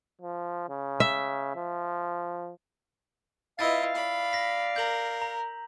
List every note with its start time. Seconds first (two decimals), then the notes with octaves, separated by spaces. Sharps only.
0.21 F3
0.69 C#3
1.00 E5
1.56 F3
3.59 E4 F4 B4 D#5 F5 E6 A6
3.95 D5 B5
4.33 A#6 B6
4.76 A#4 G6 F#7
5.22 A#5